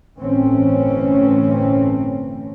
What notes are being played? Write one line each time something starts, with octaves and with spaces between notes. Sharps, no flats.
G1 A2 E3 A3 C4 C#4